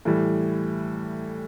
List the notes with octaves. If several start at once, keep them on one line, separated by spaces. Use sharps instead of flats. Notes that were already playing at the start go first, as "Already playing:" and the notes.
A2 E3 G3